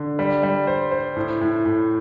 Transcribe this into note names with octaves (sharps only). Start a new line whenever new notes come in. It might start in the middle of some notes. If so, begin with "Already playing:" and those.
Already playing: D3
G3
G3
C5
C5
A2
A2
A2